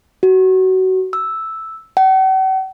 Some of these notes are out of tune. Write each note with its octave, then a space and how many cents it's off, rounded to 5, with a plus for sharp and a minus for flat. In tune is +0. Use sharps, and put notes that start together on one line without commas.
F#4 +20
E6 -5
F#5 +45